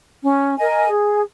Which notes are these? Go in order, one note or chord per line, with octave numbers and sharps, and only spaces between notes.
C#4
A#4 D#5 G#5
G#4